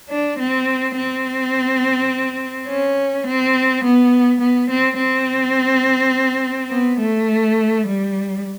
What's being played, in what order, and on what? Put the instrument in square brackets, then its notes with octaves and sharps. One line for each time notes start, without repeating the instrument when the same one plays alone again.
[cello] D4
C4
C4
C#4
C4
B3
B3
C4
C4
B3
A3
G3